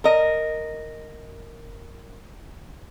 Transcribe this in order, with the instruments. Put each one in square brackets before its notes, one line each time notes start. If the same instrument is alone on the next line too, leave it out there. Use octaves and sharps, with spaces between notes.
[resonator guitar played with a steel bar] A#4 D#5